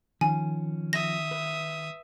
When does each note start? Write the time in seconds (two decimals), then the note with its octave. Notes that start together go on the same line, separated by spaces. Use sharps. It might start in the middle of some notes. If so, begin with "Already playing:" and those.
0.21 D#3 F3 C#4 G#5
0.93 E5 D#6 A#6
1.31 B4